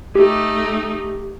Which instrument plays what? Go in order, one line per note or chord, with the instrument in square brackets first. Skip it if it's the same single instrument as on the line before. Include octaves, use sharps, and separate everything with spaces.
[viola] A3 D#4 [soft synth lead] G4